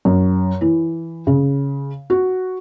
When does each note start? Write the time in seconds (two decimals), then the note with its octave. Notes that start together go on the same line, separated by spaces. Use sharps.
0.05 F#2
0.61 E3
1.27 C#3
2.10 F#4